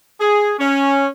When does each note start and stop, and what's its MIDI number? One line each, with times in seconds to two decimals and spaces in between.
0.20 0.53 68
0.59 1.06 61